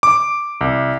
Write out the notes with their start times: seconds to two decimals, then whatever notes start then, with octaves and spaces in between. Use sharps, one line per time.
0.03 D6
0.61 C2